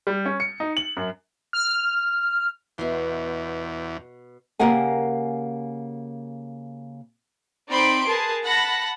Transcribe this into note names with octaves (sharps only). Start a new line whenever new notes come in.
G3
C#4
C#7
D#4
F#7
F#2
F6
E2 B2 E5 C6
C#3 A#3 G4 A#4 F#5 G#5
C4 D#4 D5 B5 C6 D7
G#4 A#4 B4 A5
F#5 A5 B5 A#6